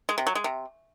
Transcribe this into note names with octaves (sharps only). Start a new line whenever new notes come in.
G#3
C3
F#3
G#3
C3